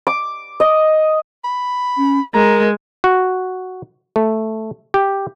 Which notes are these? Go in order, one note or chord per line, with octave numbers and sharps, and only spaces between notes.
D6
D#5
B5
C#4
G#3 A#4 A#5
F#4
A3
G4